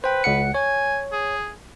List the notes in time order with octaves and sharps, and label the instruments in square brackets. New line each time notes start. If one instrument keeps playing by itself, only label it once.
[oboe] B4 [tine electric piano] C5 G5
[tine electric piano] C#2 F#5 C#7
[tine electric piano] C#5 [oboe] G#5
[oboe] G#4